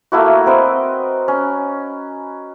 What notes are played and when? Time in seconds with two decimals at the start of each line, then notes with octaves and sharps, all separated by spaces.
0.12 A3 A#3 E4 F#4
0.46 C4 A#4 B4 D#5
1.28 C#4